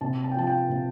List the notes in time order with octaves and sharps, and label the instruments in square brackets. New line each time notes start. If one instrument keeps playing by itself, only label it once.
[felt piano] C3 A5
A5
G5
F3 A5
G5
C3